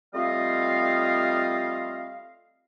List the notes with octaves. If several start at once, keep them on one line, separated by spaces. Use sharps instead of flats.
G3 A3 C4 F4 D#5 F5